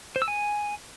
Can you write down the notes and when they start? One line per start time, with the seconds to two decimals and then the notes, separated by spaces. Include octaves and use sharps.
0.16 C5
0.22 E6
0.28 G#5